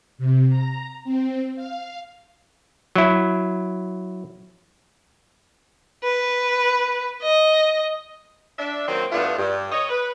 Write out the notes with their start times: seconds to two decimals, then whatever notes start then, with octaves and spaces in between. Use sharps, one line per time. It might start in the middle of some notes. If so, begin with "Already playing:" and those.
0.18 C3
0.50 A#5
1.04 C4
1.56 F5
2.95 F#3 E4
6.04 B4
7.22 D#5
8.59 D4 E5
8.88 D#3 F#3 A#3 C4
9.12 G2 A3 B3 D4 E4 F4
9.38 G2
9.71 C#5 D#5
9.89 B4